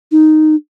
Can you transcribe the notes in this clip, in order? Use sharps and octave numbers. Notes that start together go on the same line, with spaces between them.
D#4